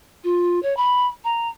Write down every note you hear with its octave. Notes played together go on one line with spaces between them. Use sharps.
F4
C#5
B5
A#5